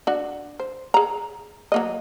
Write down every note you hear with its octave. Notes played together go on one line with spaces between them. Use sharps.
D4 F#4
C5
G#4 A#5
F#3 A#3 D#5